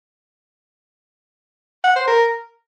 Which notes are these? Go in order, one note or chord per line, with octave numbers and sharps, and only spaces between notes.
F#5
C5
A#4